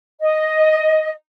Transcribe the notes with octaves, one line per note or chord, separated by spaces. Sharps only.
D#5